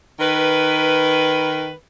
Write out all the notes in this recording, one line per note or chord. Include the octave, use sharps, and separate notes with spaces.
D#3 A#4 B4